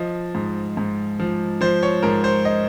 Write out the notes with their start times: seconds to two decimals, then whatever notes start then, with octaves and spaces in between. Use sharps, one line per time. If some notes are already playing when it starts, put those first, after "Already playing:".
Already playing: F3 D#5
0.35 G#2
0.77 G#2
1.20 F3
1.61 F3 C5
1.83 C#5
2.03 G#2 A#4
2.24 C5
2.45 D#5